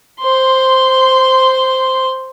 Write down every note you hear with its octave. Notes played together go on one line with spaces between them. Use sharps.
C5 C6